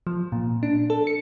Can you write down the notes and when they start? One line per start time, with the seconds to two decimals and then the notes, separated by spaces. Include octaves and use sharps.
0.07 F3
0.32 A#2
0.63 D4
0.90 A4
1.07 C#7